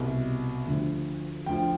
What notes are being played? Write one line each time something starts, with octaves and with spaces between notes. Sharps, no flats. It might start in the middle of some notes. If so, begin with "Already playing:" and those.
Already playing: C2 B2
D2 D3 F3
D2 D3 F3 G5